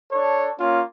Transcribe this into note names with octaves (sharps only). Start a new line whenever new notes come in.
D4 A4 C#5
A#3 C#4 F4